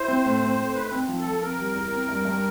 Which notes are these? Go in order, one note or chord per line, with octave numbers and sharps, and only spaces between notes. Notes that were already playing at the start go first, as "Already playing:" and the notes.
Already playing: E4 C5
C4
A2
C4
A3
D#4 B4
C4
F3
A4
F3
C4 A#4
G3
E2
C4
G2
G2